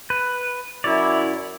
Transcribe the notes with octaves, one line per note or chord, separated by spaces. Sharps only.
B4
F#2 E4 C#5 D5